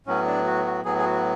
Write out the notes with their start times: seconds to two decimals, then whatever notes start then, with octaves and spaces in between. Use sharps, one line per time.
0.06 A2 F#3 B3 C#4
0.26 D4
0.46 F#4
0.66 F#4
0.85 A2 F#3 B3 G#4
0.98 G#4
1.05 F#4